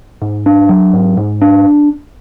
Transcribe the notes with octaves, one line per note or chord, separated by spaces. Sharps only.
G#2
D4
F#3
G#2
G#2
D4